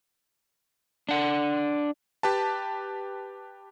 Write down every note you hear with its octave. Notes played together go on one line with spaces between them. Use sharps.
D4 F#5
G4 B4 A5